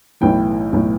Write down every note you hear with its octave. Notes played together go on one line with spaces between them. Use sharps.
B1 A2 E3 G5
B1 A2 E3